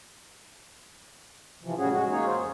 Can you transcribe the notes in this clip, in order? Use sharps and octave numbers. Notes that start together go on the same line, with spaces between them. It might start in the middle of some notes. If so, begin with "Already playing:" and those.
C3 E3 F3
A2 C#3 G3 C#4 F#4 G#4
G#3 F#4
A#3 C#4 D#4 G#4 C#5
F4 G#4 C5
F2